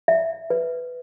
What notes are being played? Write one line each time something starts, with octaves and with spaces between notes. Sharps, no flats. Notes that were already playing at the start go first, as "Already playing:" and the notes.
E5
B4